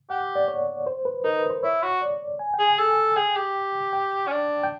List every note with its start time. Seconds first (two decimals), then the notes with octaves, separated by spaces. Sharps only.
0.10 G4 F#5
0.36 D5
0.48 C#5
0.87 C5
1.05 B4
1.24 D#4 A#4
1.37 B4
1.50 C5
1.63 E4 C#5
1.83 F#4
2.02 D5
2.39 G#5
2.54 G5
2.59 G#4
2.67 G#5
2.79 A4
3.16 G#4 G5
3.36 G4
3.93 G5
4.27 C#4
4.32 D4
4.63 G5